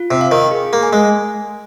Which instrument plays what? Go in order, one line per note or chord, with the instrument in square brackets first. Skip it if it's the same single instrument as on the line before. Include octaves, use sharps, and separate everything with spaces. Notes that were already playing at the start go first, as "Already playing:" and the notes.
Already playing: [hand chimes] F4
[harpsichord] C3
[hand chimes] F5
[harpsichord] D#3
[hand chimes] G#4
[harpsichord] A#3
[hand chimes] G#5
[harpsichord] G#3